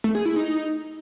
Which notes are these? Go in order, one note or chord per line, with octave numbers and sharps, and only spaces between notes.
A3
G#4
E4
D#4